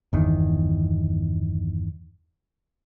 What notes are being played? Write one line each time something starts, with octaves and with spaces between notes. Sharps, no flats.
G1 E2 D#3